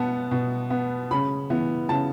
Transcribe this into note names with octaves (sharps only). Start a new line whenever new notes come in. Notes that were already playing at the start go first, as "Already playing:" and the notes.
Already playing: B2 B3 F#5 A5
B2
B3
C#3 B5
E3 B3
C#3 A5